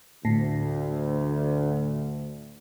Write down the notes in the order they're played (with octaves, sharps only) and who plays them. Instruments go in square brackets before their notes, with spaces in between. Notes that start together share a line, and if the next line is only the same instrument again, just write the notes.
[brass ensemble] D2 [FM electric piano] A2